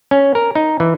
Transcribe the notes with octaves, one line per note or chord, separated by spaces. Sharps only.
C#4
A#4
D#4
E3